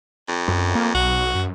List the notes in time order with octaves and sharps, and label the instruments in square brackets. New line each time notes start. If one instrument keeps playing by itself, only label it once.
[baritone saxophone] F2
[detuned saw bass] F#2
A#3
[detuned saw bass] B1 [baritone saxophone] F#4
[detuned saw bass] F#2